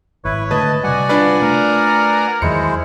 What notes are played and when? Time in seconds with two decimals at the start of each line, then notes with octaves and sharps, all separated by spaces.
0.25 G#1 E4 B4 C#5
0.51 D3 A3 B4 D#5 A5
0.84 C3 G3 F#4 D5 F#5 G#5
1.09 D4 F4 B4
1.42 A3 A#4
2.42 E2 D#3 F#3 G#3 E4 C5 C#7